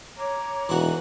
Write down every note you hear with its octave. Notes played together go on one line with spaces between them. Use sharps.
C#5 A#5 D6
E1 E3 D#4 F#4